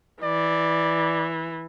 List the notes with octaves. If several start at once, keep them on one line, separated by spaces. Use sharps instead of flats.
E3 D5